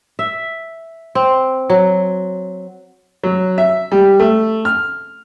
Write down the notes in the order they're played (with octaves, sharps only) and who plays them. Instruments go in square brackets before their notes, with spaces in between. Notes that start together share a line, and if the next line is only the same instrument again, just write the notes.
[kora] E5
C4
F#3
[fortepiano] F#3
E5
G3
A3
F6